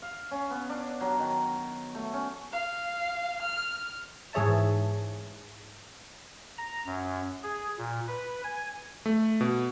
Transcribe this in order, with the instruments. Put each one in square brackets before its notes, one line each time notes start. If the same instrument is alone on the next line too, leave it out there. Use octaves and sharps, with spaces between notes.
[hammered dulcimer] F5
C#4
B3
D4
F#3
D#3
A3
C#4
[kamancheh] F5
F6
[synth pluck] G#2 E3 G#4 C#5 E5 A5
[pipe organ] A#5
F#2
G#4
A#2
B4
G#5
[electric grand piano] A3
B2